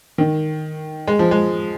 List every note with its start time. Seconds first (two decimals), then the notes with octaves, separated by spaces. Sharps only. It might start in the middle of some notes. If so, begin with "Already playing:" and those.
0.18 D#3
1.07 G#3
1.19 F3
1.31 G#3